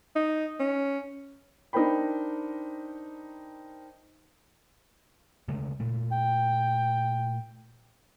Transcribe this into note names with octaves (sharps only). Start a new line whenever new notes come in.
D#4
C#4
D4 D#4 A#4 C5 G5 B5
C#3 G#3 A3
A#2 A3
G5